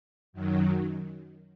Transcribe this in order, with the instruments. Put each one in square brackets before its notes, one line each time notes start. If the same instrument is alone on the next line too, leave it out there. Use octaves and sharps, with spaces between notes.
[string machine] F#2 D#3 F#3